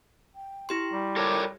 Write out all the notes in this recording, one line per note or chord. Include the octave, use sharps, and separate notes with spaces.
G5
E4 G4 C6
G3
A4 A#4 C#5 D6